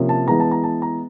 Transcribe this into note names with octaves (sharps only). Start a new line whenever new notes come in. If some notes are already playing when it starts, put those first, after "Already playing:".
Already playing: C3 F3 A#3 C#4
A5
E3 G#3 B3 A#5
A5
A#5
A5
A#5